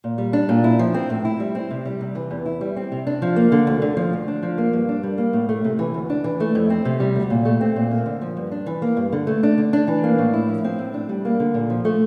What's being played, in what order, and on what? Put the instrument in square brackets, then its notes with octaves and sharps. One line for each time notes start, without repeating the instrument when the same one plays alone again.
[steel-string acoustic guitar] A#2
G3
D4
A#2
E4
F3
C4
A2
E4
G3
C4
C3
G3
C3
E3
E2
E4
G3
C4
C3
D4
F3
A#3
D3
D2
D3
F3
D2
D4
F3
A#3
G2
D4
G3
A#3
A2
A3
C3
E3
D2
D4
E3
A3
F2
C4
C3
G3
D2
A#2
A3
C4
A#2
A#3
D3
F3
G2
D4
E3
A#3
G2
D3
A3
D4
D3
D4
E3
A#3
A2
E4
F3
C4
A2
D4
G3
A#3
D3
A#2
F3
A3